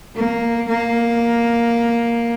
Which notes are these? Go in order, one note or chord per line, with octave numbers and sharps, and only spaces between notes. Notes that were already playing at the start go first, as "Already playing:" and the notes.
A#3
A#3